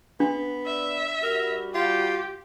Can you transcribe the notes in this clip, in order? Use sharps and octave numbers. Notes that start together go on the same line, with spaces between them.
B3 D4
D5 E5
G3 F#4 A#4
F4 G4